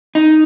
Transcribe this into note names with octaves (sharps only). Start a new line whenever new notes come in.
D#4